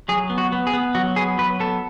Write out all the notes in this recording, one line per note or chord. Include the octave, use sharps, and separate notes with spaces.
F#3 G#4
B3
F#4
B3
G#4
B3
F#3 F#4
B3 G#4
F#3 B4
B3 A4